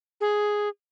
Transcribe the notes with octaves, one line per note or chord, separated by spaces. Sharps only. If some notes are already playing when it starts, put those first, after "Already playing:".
G#4